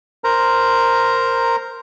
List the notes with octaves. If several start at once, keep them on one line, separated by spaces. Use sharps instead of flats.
A#4 C5 A#5